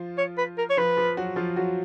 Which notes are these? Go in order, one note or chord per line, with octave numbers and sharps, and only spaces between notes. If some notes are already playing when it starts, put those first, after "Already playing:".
Already playing: F3 F4
C#5
B4
A#4
C#5
F3 F4 B4
F3 F4
F#3 F#4
F3 F4
F#3 F#4